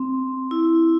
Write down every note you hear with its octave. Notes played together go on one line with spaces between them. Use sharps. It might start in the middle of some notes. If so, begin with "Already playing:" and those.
Already playing: C4
E4